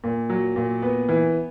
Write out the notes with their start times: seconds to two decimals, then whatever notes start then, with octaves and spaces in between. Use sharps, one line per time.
0.04 A#2
0.30 F#3
0.56 A#2
0.82 B3
1.09 E3